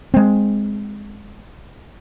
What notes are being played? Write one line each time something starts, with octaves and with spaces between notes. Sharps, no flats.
G#3 C4